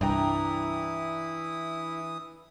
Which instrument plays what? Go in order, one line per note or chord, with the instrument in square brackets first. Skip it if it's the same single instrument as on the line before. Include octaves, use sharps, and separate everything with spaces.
[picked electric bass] C2 G2 [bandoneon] E3 D#6 [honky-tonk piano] D4 G5 A#5 [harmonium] E4